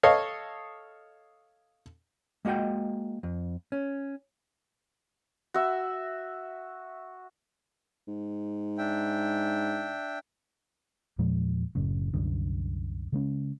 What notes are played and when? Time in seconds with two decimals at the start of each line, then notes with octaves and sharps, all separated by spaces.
0.03 A4 C#5 D#5 F5
2.45 G#3 A#3 F#4 D#5 G5
3.23 F2
3.72 C#4
5.54 F#4 E5
8.08 G#2
8.78 D4 E5 G5
11.18 E2 A#2 F3 G#3
11.75 F#1 F#2 A2 C#3
12.13 C2 F#2 D3
13.12 C#3 G#3 C#4